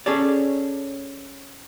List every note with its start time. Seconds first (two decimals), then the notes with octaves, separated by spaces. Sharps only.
0.06 C#4 G#4 A4 C#5 D5